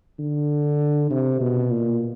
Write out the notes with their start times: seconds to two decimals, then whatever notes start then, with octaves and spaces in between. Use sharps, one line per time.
0.19 D3
1.11 C3
1.41 B2
1.71 A#2